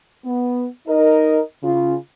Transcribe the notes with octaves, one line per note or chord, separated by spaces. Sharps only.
B3
D#4 A#4 D#5
C#3 F4